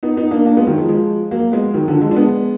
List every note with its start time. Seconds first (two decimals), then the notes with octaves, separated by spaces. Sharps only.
0.03 B3 D#4
0.17 B3 D#4
0.31 A#3 D4
0.45 A#3 D4
0.57 G#3 B3
0.67 D#3 F#3
0.78 F3 G#3
0.88 F3 G#3
1.31 F#3 A#3
1.52 G#3 B3
1.74 D#3 F#3
1.88 D3 F3
2.01 F3 G#3
2.11 D4
2.16 G#3 B3